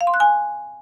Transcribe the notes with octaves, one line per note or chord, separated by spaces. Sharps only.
F5
C6
F#6
G#5